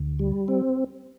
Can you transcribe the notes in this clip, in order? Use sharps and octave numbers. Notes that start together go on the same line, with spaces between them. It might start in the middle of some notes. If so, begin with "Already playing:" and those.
Already playing: D2
G3
C4